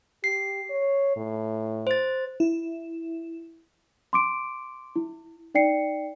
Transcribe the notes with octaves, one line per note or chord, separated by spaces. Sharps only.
G4 C7
C#5
A2
C5 A6
E4
C6 D6 D7
E4
D#4 D5 G5 C7 C#7